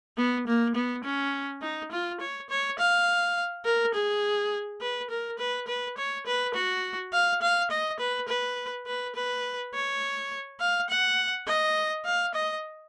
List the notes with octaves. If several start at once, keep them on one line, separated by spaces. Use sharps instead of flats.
B3
A#3
B3
C#4
D#4
F4
C#5
C#5
F5
A#4
G#4
B4
A#4
B4
B4
C#5
B4
F#4
F5
F5
D#5
B4
B4
B4
B4
C#5
F5
F#5
D#5
F5
D#5